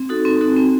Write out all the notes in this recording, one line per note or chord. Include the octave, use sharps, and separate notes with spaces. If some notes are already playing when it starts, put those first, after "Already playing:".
Already playing: C4
D#4 F#4 A4
C4
D#4 F#4 A4
C4